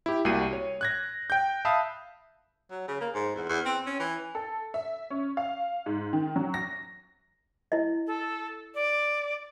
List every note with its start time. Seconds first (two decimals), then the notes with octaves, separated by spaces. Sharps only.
0.06 E4 G4
0.25 C2 G3 A#3 F#4 C7 D#7
0.53 C#5
0.81 F#6 G#6 A#6
1.30 G5 G6
1.65 E5 F5 A5 B5 D#6
2.70 F#3
2.88 C#3
3.01 A#3
3.14 G#2
3.36 E2
3.49 E2
3.65 C4
3.86 C#4
4.00 E3
4.35 A4
4.74 E5
5.10 C#4
5.37 F5
5.86 G#2
6.13 D#3
6.36 F#3
6.54 A#6
7.72 E4 D#5
8.07 A4
8.74 D5